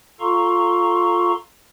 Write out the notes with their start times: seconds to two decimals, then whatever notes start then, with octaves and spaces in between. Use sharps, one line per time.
0.20 F4 A4 F5 A#5 C6 C#6